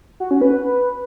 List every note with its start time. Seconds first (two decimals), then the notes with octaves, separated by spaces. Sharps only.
0.20 F#4
0.31 C#4
0.41 B4